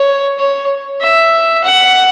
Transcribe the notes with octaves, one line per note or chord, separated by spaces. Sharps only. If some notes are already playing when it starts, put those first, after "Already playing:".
Already playing: C#5
C#5
E5
F#5